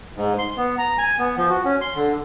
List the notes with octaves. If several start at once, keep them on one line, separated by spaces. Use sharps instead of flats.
G#2
C6
B3
A#5
G#5
B3
F3
F#4
C#4
C6
D3